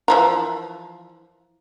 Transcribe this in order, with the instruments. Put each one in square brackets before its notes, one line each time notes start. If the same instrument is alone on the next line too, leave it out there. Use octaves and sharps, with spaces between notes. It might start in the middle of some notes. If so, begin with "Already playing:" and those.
[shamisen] E3 F3 A#4